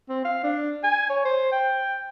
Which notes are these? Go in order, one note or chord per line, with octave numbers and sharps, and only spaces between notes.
C4
F5
D4
G#5
C#5
C5
G5